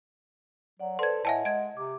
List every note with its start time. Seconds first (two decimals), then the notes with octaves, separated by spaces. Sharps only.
0.80 F#3 D5 F#5
0.99 A4 B4 C5 D5 C6 G#6
1.25 A2 D#5 E5 F#5 G#5 A5
1.45 G#3 G#6 D7
1.77 C3 D6